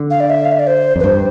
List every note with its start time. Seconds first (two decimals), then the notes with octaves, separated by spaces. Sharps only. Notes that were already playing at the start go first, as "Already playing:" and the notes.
Already playing: D3
0.10 F5
0.20 D5
0.30 E5
0.45 F5
0.52 E5
0.59 D5
0.67 C5
0.96 F2
1.00 B4
1.04 G2 C5